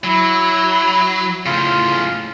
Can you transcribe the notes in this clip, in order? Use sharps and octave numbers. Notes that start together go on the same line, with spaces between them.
F#3 E4
A2 C#3 F4